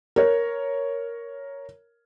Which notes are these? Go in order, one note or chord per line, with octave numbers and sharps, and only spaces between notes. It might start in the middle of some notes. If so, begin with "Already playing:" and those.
A#4 C#5